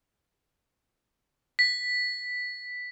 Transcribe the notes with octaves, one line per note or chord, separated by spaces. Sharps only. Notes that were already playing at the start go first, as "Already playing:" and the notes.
B6